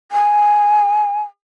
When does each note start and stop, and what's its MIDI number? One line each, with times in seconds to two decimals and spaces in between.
0.12 1.21 80